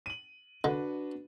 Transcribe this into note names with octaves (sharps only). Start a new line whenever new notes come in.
D#7 F#7
D3 D4 F#4 B4